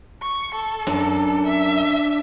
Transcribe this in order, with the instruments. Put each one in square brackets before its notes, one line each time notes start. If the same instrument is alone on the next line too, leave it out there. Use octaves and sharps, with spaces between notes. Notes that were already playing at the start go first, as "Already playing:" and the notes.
[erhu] C#6
A4
[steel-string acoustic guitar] F#2 [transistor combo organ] D4
[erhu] E5